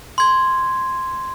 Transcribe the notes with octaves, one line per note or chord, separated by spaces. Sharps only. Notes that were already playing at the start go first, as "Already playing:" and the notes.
C6 G#6